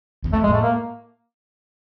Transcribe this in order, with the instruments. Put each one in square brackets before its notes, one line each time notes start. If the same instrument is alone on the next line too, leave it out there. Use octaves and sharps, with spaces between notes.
[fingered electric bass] E2
[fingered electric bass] F2 [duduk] A3
[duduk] G#3
[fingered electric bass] A2
[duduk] A3
A#3